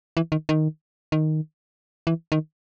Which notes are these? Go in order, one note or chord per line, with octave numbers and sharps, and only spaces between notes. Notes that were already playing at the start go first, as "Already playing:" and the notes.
E3
D#3
D#3
D#3
E3
D#3